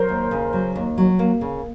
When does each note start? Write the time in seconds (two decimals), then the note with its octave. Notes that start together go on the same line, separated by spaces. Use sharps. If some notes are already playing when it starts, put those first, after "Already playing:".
Already playing: F#3 A#4 C5
0.09 D#2
0.31 C#3
0.53 F#3
0.76 D#2
0.98 F#3
1.19 A#3
1.41 C#3